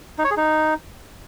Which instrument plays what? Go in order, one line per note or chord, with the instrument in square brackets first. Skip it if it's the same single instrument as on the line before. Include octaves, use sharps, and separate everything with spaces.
[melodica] D#4
C#5
G#4
D#4